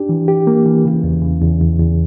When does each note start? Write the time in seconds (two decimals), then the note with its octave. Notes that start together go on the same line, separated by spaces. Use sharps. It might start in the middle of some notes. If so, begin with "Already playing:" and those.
Already playing: D4 G4
0.09 E3
0.28 G4
0.47 A#3
0.66 E3
0.85 C#3
1.04 E2
1.22 C#3
1.41 E2
1.60 E2
1.79 E2